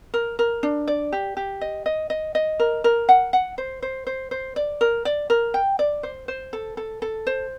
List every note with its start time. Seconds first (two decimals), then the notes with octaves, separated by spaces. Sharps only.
0.14 A#4
0.39 A#4
0.63 D4
0.88 D5
1.12 G4
1.37 G4
1.61 D#5
1.86 D#5
2.10 D#5
2.35 D#5
2.60 A#4
2.84 A#4
3.09 F#5
3.33 F#5
3.58 C5
3.82 C5
4.07 C5
4.31 C5
4.56 D5
4.81 A#4
5.05 D5
5.30 A#4
5.54 G5
5.79 D5
6.03 C5
6.28 C5
6.53 A4
6.77 A4
7.02 A4
7.27 C5